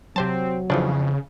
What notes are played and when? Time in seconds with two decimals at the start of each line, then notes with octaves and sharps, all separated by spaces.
0.16 C3 F#3 C4 C5 A5
0.70 F2 C#3 E3 F3 D4